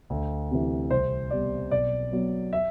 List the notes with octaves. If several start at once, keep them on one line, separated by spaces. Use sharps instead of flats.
D2
C3 E3
C2 C5
B2 G3 D5
B1 D5
B2 F#3
E5